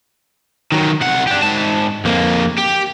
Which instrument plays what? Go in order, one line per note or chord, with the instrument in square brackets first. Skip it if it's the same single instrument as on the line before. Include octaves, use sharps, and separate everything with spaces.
[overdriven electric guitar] D#3 F#3
C2 F#5
D4 G4
G#2 A5
F2 A#3
G4